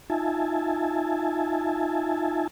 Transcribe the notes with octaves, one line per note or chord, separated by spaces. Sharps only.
D#4 F4 E5 G#5 A5